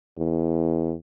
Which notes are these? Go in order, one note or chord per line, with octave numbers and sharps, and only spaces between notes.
E2